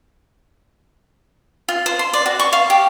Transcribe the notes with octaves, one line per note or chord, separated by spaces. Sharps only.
F4
C5
C6
D5
F#4
C#6
F5
G4